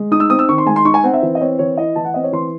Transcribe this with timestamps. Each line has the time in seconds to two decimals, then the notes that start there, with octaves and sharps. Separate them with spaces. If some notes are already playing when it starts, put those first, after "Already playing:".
Already playing: G#3
0.11 D#4 D#6
0.20 E6
0.30 C4 D#6
0.39 E6
0.49 D#3 C#6
0.58 C6
0.66 G#3 G#5
0.76 C6
0.85 D#4 C#6
0.94 G#5
1.04 C4 F#5
1.14 E5
1.23 E3
1.35 D#5
1.41 C4 C#5
1.59 E3 C#5
1.78 E4 D#5
1.96 E3 A5
2.05 F#5
2.14 C4 D#5
2.24 C#5
2.33 E3 C6